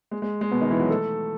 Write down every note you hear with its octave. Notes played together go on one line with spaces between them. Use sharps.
G#3
G#3
G#3
B2 B3
D#3 D#4
E3 E4
F#3 F#4
A3 A4